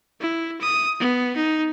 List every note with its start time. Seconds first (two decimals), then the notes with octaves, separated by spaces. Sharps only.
0.21 E4
0.61 D#6
1.00 B3
1.37 D#4